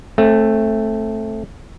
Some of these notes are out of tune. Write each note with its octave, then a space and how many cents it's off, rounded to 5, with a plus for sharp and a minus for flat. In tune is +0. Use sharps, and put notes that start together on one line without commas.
A3 +0 C4 +30